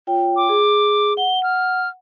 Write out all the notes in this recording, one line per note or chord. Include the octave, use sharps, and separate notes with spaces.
F4 C#5 G5
D6
G#4
F#5 G7
F6